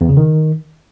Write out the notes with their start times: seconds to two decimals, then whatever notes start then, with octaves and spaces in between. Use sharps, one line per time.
0.01 E2
0.09 C#3
0.17 D#3